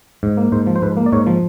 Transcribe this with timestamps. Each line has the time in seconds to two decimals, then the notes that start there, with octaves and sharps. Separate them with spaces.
0.23 G#2
0.37 A#3
0.52 G#2 C5
0.67 F3
0.76 C5
0.82 G#2 B4
0.97 A#3
1.06 D5
1.12 G#2 C#5
1.27 F3